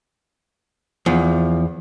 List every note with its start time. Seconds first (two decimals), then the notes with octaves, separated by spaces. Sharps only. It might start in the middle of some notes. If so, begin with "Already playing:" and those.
1.06 E2 F3